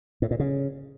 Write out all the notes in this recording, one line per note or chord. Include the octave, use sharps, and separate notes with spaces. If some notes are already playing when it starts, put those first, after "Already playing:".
A2
A#2
C#3